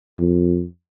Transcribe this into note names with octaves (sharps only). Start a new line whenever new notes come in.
F2